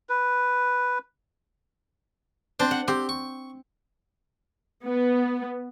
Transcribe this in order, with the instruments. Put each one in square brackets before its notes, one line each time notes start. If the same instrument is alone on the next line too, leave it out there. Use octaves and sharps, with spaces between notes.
[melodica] B4
[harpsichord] C4 C5 [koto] D4
[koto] F#5
[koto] C4 [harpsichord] G4
[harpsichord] C#6
[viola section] B3